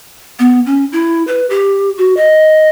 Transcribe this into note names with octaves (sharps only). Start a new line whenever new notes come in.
B3
C#4
E4
B4
G4
F#4
D#5